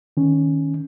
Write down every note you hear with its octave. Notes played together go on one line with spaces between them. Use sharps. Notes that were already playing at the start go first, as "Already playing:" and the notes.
D#3 C#4